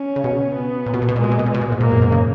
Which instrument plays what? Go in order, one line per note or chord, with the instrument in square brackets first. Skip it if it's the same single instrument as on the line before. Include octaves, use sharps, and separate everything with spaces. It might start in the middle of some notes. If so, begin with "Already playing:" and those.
Already playing: [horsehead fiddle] C#4
[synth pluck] C#3
B2
[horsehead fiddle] B3
[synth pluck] A#2
B2
A#2
B2
[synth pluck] A#2 [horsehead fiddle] G#3
[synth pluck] B2
A#2
B2
A#2
[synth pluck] B2 [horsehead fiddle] G#3
[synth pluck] A#2
G#2
[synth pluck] A#2 [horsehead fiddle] A#3
[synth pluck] F#2
G#2
C#3